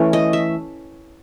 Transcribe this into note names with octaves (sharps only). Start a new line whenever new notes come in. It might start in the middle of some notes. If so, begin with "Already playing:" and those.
Already playing: E3 A3 C#4
D#5
E5